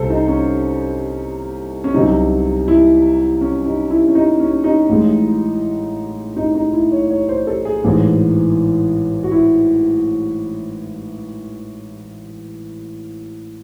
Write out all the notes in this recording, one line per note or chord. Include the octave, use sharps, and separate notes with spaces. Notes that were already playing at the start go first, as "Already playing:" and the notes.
Already playing: C2 C3 A4 C5
D#4
C#4
C#4
C2 C3 F#3 D#4
E4
C#4
D#4
E4
C#4
D#4
C#4
D#4
A1 A2 G#3
D#4
D#4
E4
C#5
C#5
C5
A4
G#4
A1 G#2 E3
F#4
E4